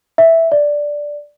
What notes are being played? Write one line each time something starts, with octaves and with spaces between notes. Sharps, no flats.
E5
D5